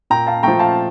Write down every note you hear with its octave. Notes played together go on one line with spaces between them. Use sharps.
A#2 G5 A#5
F5 A5
F3 A3 G5 A#5
F5 A5